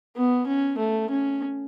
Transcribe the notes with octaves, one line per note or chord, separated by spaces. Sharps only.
B3
C#4
A3
C#4